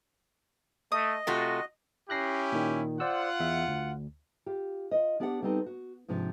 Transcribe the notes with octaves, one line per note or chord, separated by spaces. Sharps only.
A3 D#5 D#6
C3 A3 F4 F#4
C#4 E4 G4 F#6 A#6 C7
A#2 D#3
F4 C5 D5 F#5 E6
E2 E5
D2
F4 G4
F4 D#5
B3 D4 G4 D5 D#5 F#5
G3 B3 C4 D#4 A4
F#4
G#2 C3 F3 D4